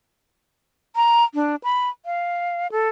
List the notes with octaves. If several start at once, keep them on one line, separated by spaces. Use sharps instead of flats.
A#5
D4
B5
F5
A4